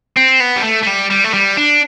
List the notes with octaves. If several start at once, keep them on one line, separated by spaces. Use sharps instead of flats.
C4
B3
G3
A3
A3
G3
G3
A3
G3
D4